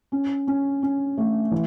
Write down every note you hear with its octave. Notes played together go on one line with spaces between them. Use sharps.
C#4
C#4
C#4
A3
E3